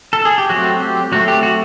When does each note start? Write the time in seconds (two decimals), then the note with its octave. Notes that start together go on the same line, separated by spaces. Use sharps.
0.13 A4
0.25 G#4
0.38 G4
0.50 F#3 A3 C4 F#4
0.80 G4
1.12 F#3 A3 C4 F#4
1.28 G4
1.43 F#4